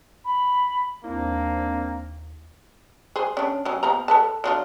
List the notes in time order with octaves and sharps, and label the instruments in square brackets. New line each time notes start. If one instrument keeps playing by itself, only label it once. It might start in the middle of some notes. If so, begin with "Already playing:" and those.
[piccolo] B5
[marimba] D#2 E4 [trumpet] A#3 [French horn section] C4 D4
[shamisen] G#4 C5
C#4 D4
F#3 C#4
F3 B3 A#5
A4 B4 A5
F#3 D4 F4